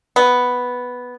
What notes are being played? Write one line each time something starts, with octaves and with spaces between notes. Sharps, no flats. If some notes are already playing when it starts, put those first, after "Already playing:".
B3